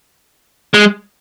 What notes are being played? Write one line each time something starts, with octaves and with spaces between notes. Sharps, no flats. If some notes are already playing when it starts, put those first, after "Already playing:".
G#3